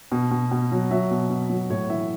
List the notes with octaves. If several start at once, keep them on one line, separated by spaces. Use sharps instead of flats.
B2
B2
B2
F#3
F#3 E5
B2
B2
F#3
A2 C#5
E3 E5